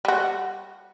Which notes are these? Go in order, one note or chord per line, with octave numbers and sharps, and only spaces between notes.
G3 F#4